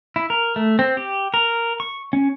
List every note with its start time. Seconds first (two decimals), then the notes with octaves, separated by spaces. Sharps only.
0.16 E4
0.30 A#4
0.56 A3
0.79 C4
0.97 G4
1.34 A#4
1.80 C#6
2.13 C#4